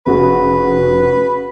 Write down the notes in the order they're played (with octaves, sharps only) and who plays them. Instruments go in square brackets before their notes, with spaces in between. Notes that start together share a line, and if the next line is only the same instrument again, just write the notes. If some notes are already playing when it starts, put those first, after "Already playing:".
[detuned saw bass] F1 [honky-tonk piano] C#3 F#4 G#4 [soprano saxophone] B4